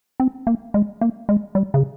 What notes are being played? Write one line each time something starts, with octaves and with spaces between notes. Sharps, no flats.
C4
A#3
G#3
A#3
G#3
G3
C#3